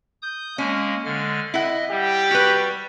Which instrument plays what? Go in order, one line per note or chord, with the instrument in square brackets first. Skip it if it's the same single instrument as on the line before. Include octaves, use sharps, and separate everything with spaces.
[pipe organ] D#6 G6
[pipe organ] G#3 A#3 [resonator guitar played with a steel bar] C#4
[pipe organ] D3 G#3 F6
[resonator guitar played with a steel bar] E4 F#5 [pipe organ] D#5
[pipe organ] G3 [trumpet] G4
[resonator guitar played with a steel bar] F#4 B4